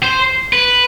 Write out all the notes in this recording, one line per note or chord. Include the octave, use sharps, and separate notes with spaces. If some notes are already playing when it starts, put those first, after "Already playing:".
C5
B4